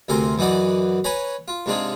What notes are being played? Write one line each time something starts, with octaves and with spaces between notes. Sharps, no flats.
D2 C3 C4 A#4 G#5 C6
F#2 E3 D#4 F#4 D5
B4 C#5 G#5 A#5 B5
F4
G#2 C3 G#3 D4 F4 G#4